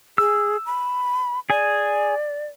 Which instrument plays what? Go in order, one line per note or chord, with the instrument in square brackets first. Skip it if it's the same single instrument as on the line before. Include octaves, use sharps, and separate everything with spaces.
[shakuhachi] G#4 [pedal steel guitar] E6
[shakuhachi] B5
[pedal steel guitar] G#4 G#5 [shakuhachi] D5